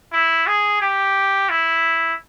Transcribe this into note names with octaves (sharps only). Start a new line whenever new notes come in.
E4
G#4
G4
E4